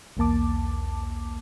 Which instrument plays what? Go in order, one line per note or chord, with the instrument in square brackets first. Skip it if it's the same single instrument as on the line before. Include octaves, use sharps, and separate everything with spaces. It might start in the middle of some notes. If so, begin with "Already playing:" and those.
[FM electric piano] B1 E2 A#3 A5 D6